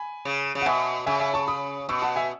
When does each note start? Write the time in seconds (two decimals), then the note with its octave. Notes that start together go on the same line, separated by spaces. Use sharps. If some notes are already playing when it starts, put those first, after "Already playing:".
Already playing: G#5 B5
0.25 C#3
0.55 C#3
0.61 F#5
0.66 B2 E5 G#5
1.06 C#3 E5 G#5
1.20 E5 G#5
1.34 A5 C#6
1.48 B5 D#6
1.89 B2 C#6 E6
2.02 F#5 A5
2.16 E5 G#5